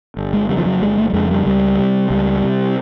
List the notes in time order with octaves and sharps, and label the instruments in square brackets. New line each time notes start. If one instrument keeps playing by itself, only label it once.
[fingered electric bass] G1
G#3
F2 C#3 G3
F3
F#3
G1 G#3
A3
G3
F2 C#3 G#3
G3
C#2 G3
C3
C#2 G3
C3